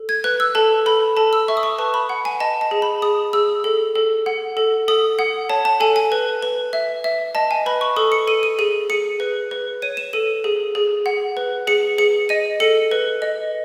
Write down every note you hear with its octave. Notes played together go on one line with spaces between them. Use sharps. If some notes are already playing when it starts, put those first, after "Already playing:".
Already playing: A4
G#6
B4 F#6
E6
A4 A5
A4 B5
A4 A5
E6
E5 C#6
D#6
C#6
B4 A5
B5
F#5
G#5
D#5 A5
A5
G#4
B5
G#4 D#6
G#4 E6
A4
A4
F#5
A4
A4 D#6
F#5
C#5 A5
A5
A4 G#5
G#5
B4
B4
E5
E5
D#5 A5
G#5
B4 B5
C#6
A4 D#6
C#7
A4 D#7
D#7
G#4 D#7
G#4 C#7
B4
B4
C#5 D#7
E7
A4 D#7
G#4
G#4
F#5
B4
G#4 C#7
G#4 C#7
D#5 D#7
A4 C#7
B4
D#5